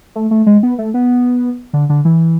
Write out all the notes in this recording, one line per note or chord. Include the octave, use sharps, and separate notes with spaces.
A3
A3
G#3
B3
A3
B3
D3
D3
E3